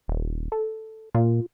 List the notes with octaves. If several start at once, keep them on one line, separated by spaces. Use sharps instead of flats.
D#1
A4
A#2 F4